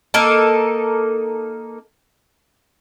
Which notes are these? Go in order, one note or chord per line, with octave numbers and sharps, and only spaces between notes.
A#3 D#4 A4